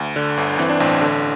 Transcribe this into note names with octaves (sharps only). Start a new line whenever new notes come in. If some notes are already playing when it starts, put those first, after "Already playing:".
Already playing: D2
D3
G1
E3 C4
D4
A1 C4
D3